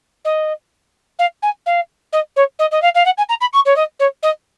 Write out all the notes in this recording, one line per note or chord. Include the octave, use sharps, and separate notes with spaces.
D#5
F5
G#5
F5
D#5
C#5
D#5
D#5
F5
F5
F#5
G#5
A#5
B5
C#6
C#5
D#5
C#5
D#5